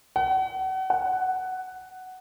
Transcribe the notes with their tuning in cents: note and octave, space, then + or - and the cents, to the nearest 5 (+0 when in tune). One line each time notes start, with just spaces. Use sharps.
F#5 +35
F#5 +10